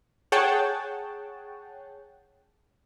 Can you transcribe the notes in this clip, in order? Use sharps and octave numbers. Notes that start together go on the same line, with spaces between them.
G#4 C#5 F#5 G5 A5